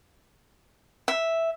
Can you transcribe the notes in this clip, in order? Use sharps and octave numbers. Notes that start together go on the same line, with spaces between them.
E5